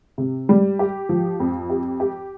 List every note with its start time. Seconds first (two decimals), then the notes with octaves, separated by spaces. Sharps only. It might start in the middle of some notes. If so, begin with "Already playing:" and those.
0.18 C3
0.49 G3
0.79 G4
1.09 F3
1.40 F2
1.70 G4
2.00 G4